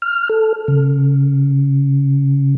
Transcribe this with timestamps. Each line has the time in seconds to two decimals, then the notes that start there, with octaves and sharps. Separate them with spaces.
0.02 F6
0.29 A4
0.68 C#3